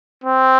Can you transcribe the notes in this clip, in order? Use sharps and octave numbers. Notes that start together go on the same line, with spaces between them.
C4